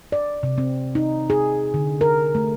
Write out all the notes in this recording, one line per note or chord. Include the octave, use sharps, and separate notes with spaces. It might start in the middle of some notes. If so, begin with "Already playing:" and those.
D5
C3
C4
D#4
G#4
D3
A#4
A3